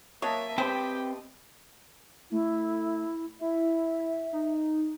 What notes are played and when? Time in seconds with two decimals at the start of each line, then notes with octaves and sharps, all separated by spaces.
0.22 F#3 A#3 C#5 D#5 E5 A5
0.58 C4 G4 B4 C5 G5
2.31 A3 E4
3.41 E4 E5
4.33 D#4